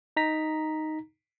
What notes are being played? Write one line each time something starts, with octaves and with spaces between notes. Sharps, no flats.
D#4 A#5 B6